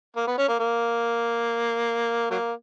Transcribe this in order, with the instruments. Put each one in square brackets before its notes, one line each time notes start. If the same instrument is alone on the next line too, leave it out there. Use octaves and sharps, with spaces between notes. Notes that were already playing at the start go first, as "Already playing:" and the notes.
[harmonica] A#3
B3
C#4
A#3
A#3
F#3 A#3